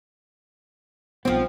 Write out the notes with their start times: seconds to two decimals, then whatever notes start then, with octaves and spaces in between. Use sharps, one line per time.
1.25 B1 G2 F3 B3 C4